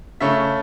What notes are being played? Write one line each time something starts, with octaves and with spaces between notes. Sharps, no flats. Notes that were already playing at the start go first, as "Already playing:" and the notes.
C#3 A3 C#4 E5